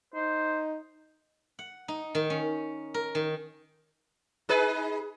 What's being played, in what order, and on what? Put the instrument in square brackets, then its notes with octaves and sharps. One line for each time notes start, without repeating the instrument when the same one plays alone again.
[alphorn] D#4 [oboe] C5
[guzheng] F#5
D#4
D#3
C#4
A#4
D#3
[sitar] D#4 G#4 B4